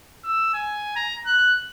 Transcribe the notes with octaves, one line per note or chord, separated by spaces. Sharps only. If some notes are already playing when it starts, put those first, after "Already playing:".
E6
G#5
A#5
F#6